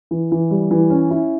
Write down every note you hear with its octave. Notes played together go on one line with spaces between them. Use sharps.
E3
E3
G3
E3
C#4
E4